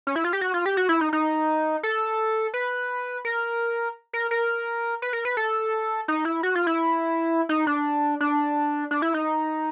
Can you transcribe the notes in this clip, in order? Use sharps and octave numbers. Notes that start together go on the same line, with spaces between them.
C#4
E4
F4
G4
F#4
F4
G4
F#4
E4
D#4
D#4
A4
B4
A#4
A#4
A#4
B4
A#4
B4
A4
D#4
E4
F#4
F4
E4
D#4
D4
D4
D4
E4
D#4